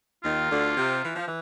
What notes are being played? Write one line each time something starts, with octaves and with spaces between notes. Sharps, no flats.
D#2 D#3 F4
D2 D3
C3
E3
F3
E3